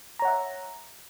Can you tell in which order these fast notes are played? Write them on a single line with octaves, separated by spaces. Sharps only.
A#5 C#5 F#5 E5